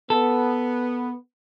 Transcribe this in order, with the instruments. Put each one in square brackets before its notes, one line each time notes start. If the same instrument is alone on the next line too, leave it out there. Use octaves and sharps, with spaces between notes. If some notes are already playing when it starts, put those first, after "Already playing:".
[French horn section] B3 [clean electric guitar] A4